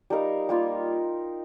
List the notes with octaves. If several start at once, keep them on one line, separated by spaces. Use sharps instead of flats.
G3 D#4 A#4 F5
G3 A#3 F4